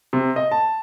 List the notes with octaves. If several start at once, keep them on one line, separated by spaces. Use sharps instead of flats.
C3
D#5
A5